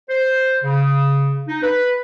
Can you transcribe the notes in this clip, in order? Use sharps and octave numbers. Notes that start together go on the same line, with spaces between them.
C5
C#3
D#4
B4